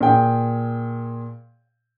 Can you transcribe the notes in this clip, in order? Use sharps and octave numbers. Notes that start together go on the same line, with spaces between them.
A#2 G#4 G5